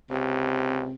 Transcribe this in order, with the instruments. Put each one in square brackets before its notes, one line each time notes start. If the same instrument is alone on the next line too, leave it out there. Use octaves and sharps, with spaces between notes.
[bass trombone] C#2 [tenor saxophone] C3